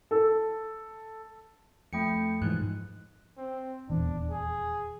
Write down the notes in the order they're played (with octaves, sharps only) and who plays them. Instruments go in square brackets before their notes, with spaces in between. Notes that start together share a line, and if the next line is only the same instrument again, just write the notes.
[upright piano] A4
[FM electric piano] F2 [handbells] A3 G5 C#7
[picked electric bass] G#2 [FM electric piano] B2 E3 F3 [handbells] F#6
[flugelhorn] C4
[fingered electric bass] D#1 E2 [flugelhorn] D4
[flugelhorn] G#4